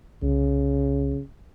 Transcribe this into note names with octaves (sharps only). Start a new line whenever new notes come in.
C2 C#3